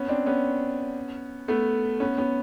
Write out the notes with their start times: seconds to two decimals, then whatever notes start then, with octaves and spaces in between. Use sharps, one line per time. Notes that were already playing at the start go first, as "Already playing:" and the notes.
Already playing: B3 C#4
0.08 C4 D4
0.26 B3 C#4
1.48 A3 B3
2.00 B3 C#4
2.18 B3 C#4